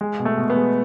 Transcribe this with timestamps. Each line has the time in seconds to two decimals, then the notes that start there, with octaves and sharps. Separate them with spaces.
0.01 G#3
0.19 B2
0.25 A3
0.37 B2
0.50 B3
0.56 G#3